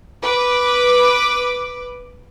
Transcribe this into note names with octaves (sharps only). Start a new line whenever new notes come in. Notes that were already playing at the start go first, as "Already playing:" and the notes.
B4 D6